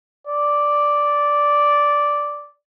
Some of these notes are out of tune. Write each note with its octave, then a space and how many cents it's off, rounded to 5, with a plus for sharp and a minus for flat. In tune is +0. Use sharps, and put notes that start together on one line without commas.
D5 -5